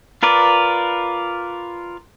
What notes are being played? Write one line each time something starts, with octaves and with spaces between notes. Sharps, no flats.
F4 A#4 B4 D5